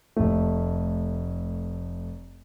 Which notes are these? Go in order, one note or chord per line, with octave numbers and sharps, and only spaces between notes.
F1 A3